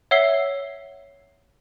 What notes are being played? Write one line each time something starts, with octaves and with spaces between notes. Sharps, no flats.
C#5 E5 F#5 E6 C7 G7